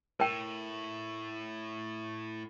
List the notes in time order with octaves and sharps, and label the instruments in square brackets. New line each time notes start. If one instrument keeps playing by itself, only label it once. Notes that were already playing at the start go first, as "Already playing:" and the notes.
[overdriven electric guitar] A2 [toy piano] A#4 G5